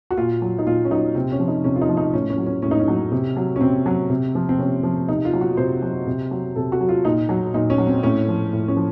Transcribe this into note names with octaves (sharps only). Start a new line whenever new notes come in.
F#4
A#2 F4
F#3
D#4
A#2 F4
C#4
F#3 D#4
C3 C4
C#4
F3
D#4
C3 C#4
F4
D#4
F3
D#4
A2 C#4
C#4
F#3
C#4
A2 C#4
D#4
C#4
F#3
C3
F#3
C#4
C3 C4
F#3
C3
F3
C4
C3 C#4
F3
C3 D#4
F4
F#3
F#4
C3 C5
F#3
C3
F#3
C3 A4
F#4
F#3
F4
A#2 D#4
F#3
A#2 D#4
C#4
F#3
C4
A2 C#4
F3
A2
C#4
F3